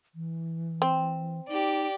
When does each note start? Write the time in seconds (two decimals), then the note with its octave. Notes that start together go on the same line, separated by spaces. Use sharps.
0.15 E3
0.82 C4
1.49 D#4 G4 D5